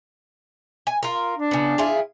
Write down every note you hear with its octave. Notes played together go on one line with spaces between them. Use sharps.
G#5
F4 A#4
D4
C#3 B3
E4 F4 G#4